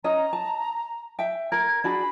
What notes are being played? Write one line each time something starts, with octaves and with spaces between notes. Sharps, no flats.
C#4 D#5 A#5
A5
E5 G5
A#4 G#6
D4 F#4 G#4 B5